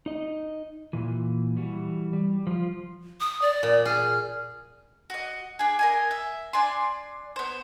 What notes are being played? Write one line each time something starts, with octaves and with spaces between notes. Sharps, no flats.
D#4 D#5
A#2 E3
E3 G3 F#4
G3
F3 F4
D#6
D5
A#2
G#4 F6
F#4 D#5
D4 G#4
A#4 D#5 G#5
E5
D4 D5 G#5 C6
B3 C5